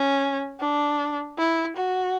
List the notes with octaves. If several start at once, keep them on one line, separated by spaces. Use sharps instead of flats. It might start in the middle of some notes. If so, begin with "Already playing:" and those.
Already playing: C#4
D4
E4
F#4